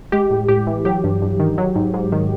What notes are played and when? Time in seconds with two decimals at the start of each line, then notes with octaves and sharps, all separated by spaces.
0.12 G#3 G4
0.31 A2
0.48 A2 G4
0.67 E3
0.85 F#3 G4
1.04 G2
1.22 G2
1.40 D#3
1.58 F#3
1.75 G#2
1.94 G#2
2.12 D#3